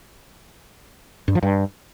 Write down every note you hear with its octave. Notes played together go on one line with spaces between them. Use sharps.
G2
F3
G2